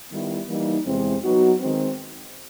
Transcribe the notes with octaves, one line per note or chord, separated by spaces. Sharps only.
D#3 G3 B3 E4
E3 G3 A#3 D#4
E2 C3 E3 G#3 C4
F#3 B3 D#4 F#4
D#3 G#3 C4